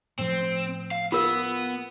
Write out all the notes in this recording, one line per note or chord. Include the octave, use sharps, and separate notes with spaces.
A2 F3 C4
F5
B3 F4 A#4